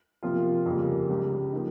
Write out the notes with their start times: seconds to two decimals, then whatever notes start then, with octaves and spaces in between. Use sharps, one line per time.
0.23 C3 F3 A#3 F4
0.66 F2 C#3 G3 A#3
1.09 C#2 C#3 G3
1.53 F3 A#3 D#4